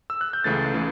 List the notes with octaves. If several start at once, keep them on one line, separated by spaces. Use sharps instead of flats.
E6
F#6
G6
C#2 C#3 E3 A3 A6
C#3 E3 A3